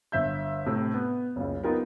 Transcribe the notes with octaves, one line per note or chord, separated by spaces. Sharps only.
G1 E5 G6
A2 C3
B3
F#1 C#2
B3 D#4 F4 G4 A#4